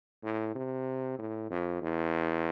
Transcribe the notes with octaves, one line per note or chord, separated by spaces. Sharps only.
A2
C3
A2
F2
E2